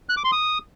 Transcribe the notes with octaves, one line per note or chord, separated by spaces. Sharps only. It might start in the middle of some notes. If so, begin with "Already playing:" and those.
F#6
D6
C6
D#6